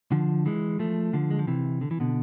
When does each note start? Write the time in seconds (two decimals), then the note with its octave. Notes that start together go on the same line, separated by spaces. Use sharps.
0.12 D3 F3
0.46 E3 G#3
0.79 F3 A3
1.13 D3 F3
1.31 G#3
1.39 F3
1.47 C3 E3
1.81 D3
1.91 E3
2.00 B2 D3